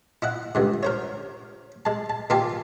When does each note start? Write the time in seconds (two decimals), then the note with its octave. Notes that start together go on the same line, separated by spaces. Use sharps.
0.22 E4 D#5 F#5
0.55 C#2 G2 D3
0.83 A#4 C5 C#5
1.85 G#3 A5
2.10 A5
2.30 A#2 D#3 F4 G4 G#5 A5